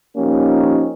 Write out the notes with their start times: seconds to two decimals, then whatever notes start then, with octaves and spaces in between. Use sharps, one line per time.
0.17 F3 A#3 C#4 D#4 G4